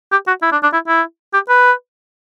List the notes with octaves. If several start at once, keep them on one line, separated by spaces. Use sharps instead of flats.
G4
F#4
E4
D4
D4
E4
E4
G4
B4